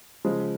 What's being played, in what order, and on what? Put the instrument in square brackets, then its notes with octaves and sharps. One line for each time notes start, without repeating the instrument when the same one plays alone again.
[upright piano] C#3 F3 G#3